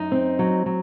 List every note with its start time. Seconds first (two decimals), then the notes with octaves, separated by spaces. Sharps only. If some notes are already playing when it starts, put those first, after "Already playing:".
Already playing: F#2 D#4
0.12 C4
0.39 F#3
0.66 F#3